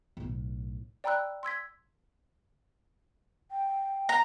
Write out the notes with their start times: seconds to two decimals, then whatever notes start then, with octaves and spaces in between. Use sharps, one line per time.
0.17 B1 A2
1.04 D5 G5 A#5 B5 E6 F#6
1.43 C6 E6 G#6 B6
3.51 G5
4.09 A#5